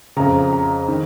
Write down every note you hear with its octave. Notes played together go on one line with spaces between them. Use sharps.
F2 C#3 A#5
A#5
D#3